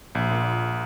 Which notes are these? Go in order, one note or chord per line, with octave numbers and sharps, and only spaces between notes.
A#1
A#2